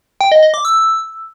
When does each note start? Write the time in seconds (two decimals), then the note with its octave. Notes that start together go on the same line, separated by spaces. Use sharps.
0.21 G5
0.32 D#5
0.43 D#5
0.54 D6
0.65 E6